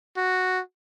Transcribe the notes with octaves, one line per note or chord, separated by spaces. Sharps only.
F#4